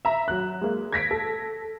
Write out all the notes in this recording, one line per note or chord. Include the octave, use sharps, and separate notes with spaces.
E5 A#5
F#3 F#6
G#3 A#3
G#6 A#6 B6 D7
A4